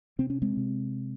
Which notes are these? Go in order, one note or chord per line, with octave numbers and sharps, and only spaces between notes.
C3 C4
C#4
G#3 C4
C3